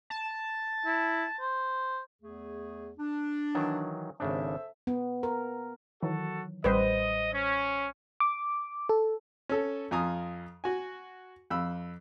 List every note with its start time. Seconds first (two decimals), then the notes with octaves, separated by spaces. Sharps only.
0.10 A5
0.86 E4
1.40 C5
2.22 E2 A3 G#4
2.97 D4
3.55 D#3 E3 F#3
4.20 G#1 C#3 D4 A4 C5 E5
4.87 B3
5.23 A#4
6.02 D#3 E3 F#3 F#4 A4
6.64 A1 G3 B4 C5 D#5
7.34 C#4
8.20 D6
8.89 A4
9.49 C#4 A4
9.91 F2 F4 G#5 A#5 D#6
10.64 F#4 G#5
11.50 F2 B5 E6